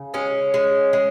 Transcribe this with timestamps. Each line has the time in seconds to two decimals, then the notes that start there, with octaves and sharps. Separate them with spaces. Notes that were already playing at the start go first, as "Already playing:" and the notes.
Already playing: C#3
0.14 G#3 C#4
0.54 G#3
0.93 G#3